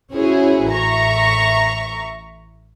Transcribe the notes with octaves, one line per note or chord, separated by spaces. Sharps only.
C#4 E4 F#4 G#4 C5 C#5
A1 E5 A#5 C#6